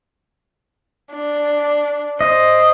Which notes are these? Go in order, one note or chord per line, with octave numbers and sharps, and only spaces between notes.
D4
C5 D#5